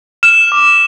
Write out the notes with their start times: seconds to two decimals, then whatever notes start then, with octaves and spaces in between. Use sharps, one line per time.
0.23 F6 E7
0.52 D6